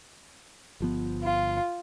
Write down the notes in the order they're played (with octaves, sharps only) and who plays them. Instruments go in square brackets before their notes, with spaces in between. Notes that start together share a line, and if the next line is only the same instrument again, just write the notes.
[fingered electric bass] G1 F3 B3
[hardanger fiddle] F4